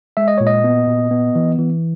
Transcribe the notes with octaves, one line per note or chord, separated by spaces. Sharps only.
G#3 E5
D#5
A#2 C#5
D#5
B3
A#2
B3
E3
E3